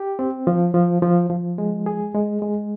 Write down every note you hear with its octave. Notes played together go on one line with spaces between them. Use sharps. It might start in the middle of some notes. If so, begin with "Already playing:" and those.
Already playing: G4
C4
F3
F3
F3
F3
G#3
G#4
G#3
G#3